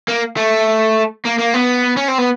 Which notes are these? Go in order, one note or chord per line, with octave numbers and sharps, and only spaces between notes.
A#3
A3
A#3
A#3
B3
C#4
C4
B3